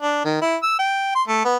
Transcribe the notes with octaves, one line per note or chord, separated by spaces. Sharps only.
D4
D#3
E4
E6
G5
C6
A3
B3